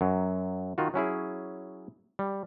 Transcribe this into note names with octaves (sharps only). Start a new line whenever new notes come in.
F#2 F#3
D#3 F4 F#4
F#3 C#4 E4 G#4
G3